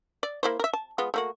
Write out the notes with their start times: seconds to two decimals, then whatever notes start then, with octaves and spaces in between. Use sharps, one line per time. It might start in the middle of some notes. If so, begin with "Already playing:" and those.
0.23 D5
0.43 A#3 E4 C5
0.59 A#4 E5
0.73 A5
0.98 G#3 B3 F4
1.14 A3 A#3 F#4